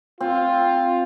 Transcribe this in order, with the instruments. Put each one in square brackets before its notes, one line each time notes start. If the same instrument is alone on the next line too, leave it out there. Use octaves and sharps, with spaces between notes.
[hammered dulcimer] C4 [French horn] F4